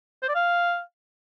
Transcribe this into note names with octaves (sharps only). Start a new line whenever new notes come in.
C5
D5
F5